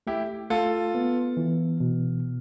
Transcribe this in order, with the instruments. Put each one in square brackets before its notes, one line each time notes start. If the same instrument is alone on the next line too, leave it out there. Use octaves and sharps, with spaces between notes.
[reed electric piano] A3 [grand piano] E4 G4
[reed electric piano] A3 [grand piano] F4 A4
[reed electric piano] B3
E3
B2